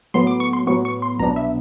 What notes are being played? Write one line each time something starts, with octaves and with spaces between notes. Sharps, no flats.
A2 F#3 B3 C6
D6
C#6
C6
A2 F#3 B3 C#6
C#6
C6
C2 B2 F#3 B3 D4 A#5
E5